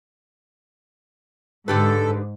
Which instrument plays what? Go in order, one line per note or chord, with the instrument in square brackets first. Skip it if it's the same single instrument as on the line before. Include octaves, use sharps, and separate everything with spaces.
[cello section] G#2 [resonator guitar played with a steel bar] D3 G4 B4 [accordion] A4